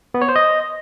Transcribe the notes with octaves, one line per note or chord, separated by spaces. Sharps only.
B3
C#5
C5
D#5